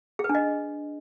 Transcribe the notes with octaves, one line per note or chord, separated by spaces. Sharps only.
G#4
B4
D4
D#5